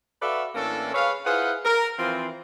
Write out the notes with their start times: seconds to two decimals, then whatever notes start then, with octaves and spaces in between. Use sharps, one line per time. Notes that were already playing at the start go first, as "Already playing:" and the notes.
0.22 F#4 A4 B4 D5 E5 F5
0.55 A2 E3 A#3 C#4 D4 A4
0.94 G#4 B4 C#5 F5
1.26 E4 F4 G#4 B4 C5 F#5
1.65 A#4
1.99 E3 F3 C4 F4